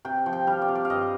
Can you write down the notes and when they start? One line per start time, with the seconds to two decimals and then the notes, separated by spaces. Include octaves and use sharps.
0.05 C3 G5
0.26 F3
0.33 G5
0.47 G3 F5
0.62 D5
0.69 C3
0.75 D5
0.85 F5
0.90 G2 D#5